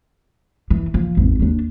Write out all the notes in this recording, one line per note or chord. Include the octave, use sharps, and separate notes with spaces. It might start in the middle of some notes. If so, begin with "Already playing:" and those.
E3
F3
G#1 E2
D#2 D4